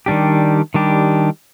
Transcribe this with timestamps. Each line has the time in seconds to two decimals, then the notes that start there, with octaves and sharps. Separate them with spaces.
0.06 D#3 G3 D4 G4
0.74 D#3 G3 D4 G4